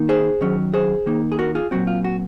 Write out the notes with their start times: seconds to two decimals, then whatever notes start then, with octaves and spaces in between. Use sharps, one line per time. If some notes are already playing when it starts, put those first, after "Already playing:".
Already playing: D#3 A#3 D#4
0.09 G#4 C5
0.41 D#3 F#3 C#4
0.74 G#4 C5
1.06 D#3 A#3 D#4
1.32 G#4
1.39 F#4 A#4
1.55 F4 G#4
1.71 A#2 F#3 C4 F#4
1.87 F4
2.04 F#4